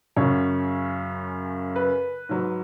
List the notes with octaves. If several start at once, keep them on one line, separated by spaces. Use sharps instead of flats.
F#2 C#3 F#3 C#5
B4
G#2 F#3